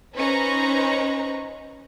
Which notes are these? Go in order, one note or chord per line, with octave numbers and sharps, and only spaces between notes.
C#4 D#4 B4 C5 A#5 C#6